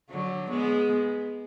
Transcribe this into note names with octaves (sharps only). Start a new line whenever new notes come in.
D3 F#3
G#3 B3